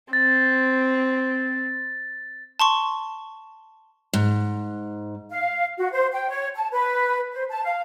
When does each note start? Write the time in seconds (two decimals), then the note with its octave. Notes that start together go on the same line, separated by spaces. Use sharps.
0.13 C4 A6
2.60 A5 C6 C#6
4.13 G#2
5.30 F5
5.77 F#4
5.92 C5
6.12 G5
6.30 C#5
6.55 A5
6.71 B4
7.32 C5
7.49 A5
7.65 F5